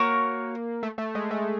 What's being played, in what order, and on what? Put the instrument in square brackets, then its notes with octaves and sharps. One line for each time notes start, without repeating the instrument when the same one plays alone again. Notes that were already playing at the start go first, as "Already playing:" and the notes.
Already playing: [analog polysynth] A#3 [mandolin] F#4 A#4 C#5
[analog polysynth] A3
A3
G#3
A3